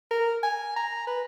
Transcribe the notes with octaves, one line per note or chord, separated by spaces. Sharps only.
A#4
G#5
A#5
B4